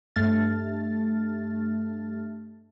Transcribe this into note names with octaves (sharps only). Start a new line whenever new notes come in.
G2 A3 F6 A6